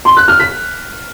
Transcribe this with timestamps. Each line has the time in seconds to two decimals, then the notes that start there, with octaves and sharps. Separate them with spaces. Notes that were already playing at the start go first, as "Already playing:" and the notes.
0.05 C6
0.17 F#6
0.28 F6
0.40 B6